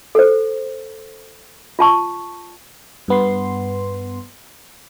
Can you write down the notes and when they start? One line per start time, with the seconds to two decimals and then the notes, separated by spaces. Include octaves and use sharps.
0.15 A4 C5
1.79 F4 A5 C#6
3.08 G2 B3 C6